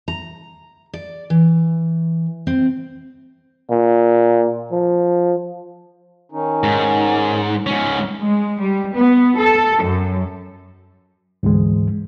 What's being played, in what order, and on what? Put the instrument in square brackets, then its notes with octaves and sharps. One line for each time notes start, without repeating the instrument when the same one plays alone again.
[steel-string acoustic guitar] A#5
D5
E3
C4
[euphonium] A#2
F3
[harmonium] D#3 C#4 D#4
[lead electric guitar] G#2
G#2 C#4
[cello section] G#3
G3
B3
A4
F#2
[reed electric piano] D2 G#2 E3 G#3